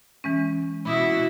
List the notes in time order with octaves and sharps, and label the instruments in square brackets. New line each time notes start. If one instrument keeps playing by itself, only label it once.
[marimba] E3 G#3 C#4
[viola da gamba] B2 E4 F#4 [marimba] B5 D6 D#6